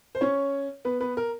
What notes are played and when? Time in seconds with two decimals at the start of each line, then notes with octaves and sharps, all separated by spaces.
0.15 C5
0.21 C#4 C#5
0.85 B3 B4
1.01 B3 B4
1.17 A#4